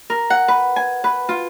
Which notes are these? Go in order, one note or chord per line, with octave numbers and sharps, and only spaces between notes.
A#4
F#5
B4
G#5
B4
F4